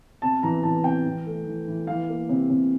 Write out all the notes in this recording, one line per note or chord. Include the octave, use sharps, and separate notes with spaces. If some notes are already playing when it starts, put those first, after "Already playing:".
C3 A5
E3 A#5
E3 A5
C3 G5
E3
A3
E3
E3
E3 F5
A#3
C3
C3